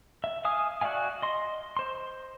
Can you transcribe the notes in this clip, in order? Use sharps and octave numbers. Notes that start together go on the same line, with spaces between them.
E5
E5 F5 G#5 D#6
F#4 D5 E5 F5 G#5
D#5 C6
C5 C6